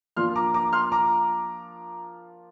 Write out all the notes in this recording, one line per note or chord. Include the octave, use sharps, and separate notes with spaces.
F3 A#3 D4 F4 C6 F6
A#5 D6
A#5 D6
C6 F6
A#5 D6